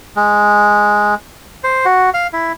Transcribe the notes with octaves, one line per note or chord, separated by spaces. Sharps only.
G#3
C5
F#4
F5
E4